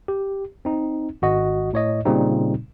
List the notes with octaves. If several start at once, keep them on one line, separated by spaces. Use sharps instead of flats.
G4
C4 D#4
G#1 F#4 D#5
A2 C#5 D#5
A#2 C#3 G3 C4 D#4